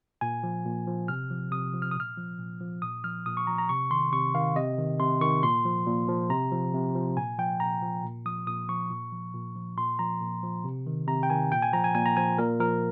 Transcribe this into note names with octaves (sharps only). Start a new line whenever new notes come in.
A#2 G#5
F3
A#2
F3
C3 F6
F3
C3 D#6
F3
F6
D#6
A#2 F6
F3
A#2
F3
A#2 D#6
F3 F6
A#2 D#6
C#6
F3 A#5
A#5
C3 C#6
D#3 C6
C3 C#6
D#3 F5
C3 D#5
D#3
C3 C6
D#3 C#6
A#2 C6
F3
A#2
F3
C3 A#5
F3
C3
F3
A#2 G#5
F3 G5
A#2 A#5
F3
A#2
F3 D#6
A#2 D#6
F3 C#6
A#2
F3
A#2
F3
A#2 C6
F3 A#5
A#2
F3
C3
D#3
C3 A#5
G5
D#3 G#5
A#2 G5
G#5
F3 A#5
G#5
A#2 G#5
A#5
F3 G#5
A#2 A#4
F3 A#4